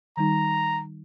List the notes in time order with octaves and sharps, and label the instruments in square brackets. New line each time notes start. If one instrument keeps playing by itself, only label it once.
[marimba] D#3 G3 D#4 [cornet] A#5